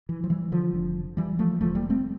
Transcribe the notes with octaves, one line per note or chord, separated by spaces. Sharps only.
E3
F3
E3 G3
D3 F3
F1 F2 D3
E3 G3
F3 A3
E1 E2 D3 F3 A3
G3 A#3
A3 C4